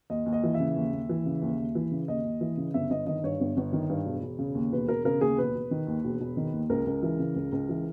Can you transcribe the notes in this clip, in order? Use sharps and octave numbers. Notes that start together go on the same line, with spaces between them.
D#2 D#5
D#2
D#5
E3
E5
C#3
D#2
D#2
E3
C#3
D#2
D#2
E3
C#3
D#2 D#5
D#2
E3
C#3
G1 E5
G1 D#5
D#3 D#5
G2 C#5
G1
G1
D#3
G2
E1
E1
C#3
D#2
E1 B4
E1 A#4
C#3 A#4
D#2 G#4
E1 B4
E1
D#3
D#2
E1
E1
D#3
D#2
C#2 A#4
C#2
E3
C#3
C#2
C#2
E3